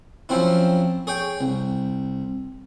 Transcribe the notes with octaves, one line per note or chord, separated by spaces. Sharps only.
F3 F#3 C4 C#4 E4
G#4 C#5 G5
C2